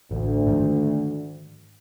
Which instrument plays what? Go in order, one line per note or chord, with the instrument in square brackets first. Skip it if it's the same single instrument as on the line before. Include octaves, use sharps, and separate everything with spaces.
[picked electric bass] A1 [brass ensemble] D2
[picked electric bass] G#2 D#3 F3